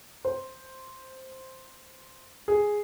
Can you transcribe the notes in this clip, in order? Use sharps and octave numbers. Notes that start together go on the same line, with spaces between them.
C5
G#4